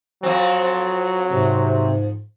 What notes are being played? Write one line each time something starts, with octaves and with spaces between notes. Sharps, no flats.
F2 F#3 C4
G#2 C3